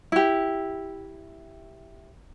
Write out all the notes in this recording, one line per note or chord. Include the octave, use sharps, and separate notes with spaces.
E4 G4